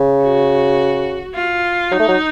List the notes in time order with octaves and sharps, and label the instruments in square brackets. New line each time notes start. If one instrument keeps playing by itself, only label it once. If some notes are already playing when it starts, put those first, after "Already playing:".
Already playing: [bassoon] C#3
[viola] F#4
F4
[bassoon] F#3 [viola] D#4
[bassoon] A3
F#3